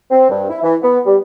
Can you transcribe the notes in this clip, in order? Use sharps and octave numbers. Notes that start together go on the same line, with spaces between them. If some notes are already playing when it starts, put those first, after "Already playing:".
C4
G2
E4
E3
B3
G3